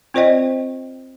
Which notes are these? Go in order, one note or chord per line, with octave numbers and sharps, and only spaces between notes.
C4 F4 C5 D5 D#5 G5